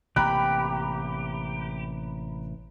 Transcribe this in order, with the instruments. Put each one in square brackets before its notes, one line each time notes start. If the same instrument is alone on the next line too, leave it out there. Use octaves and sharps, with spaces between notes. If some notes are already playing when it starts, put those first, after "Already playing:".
[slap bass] A1 C3 A#3 [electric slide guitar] G4 [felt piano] A#5 B5 F#6